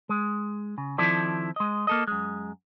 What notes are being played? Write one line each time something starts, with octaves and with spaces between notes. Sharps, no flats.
G#3
C#3
D#3 F3 C4 E4 A4 D5
G#3 D#5
A#3 A4 D#5
F#2 G#3